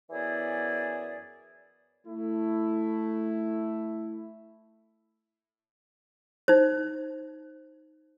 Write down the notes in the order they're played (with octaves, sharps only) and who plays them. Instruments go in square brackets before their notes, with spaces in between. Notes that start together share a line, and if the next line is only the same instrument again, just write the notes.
[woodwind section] F#2 E3 B3 E4 G#4 D5
[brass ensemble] A3 E4
[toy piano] D#4 C5